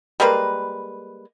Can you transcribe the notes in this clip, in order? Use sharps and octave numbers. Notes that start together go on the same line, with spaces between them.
G3 G#3 A#3 B4